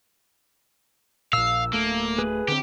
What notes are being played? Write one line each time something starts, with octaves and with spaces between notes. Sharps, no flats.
A#1 A#2 F5 E6
D1 A3 A#3
G#4 B4
D3 C4 G4